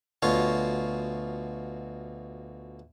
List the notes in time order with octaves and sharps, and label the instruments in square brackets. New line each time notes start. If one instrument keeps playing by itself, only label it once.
[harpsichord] D2 B2 F4 C#5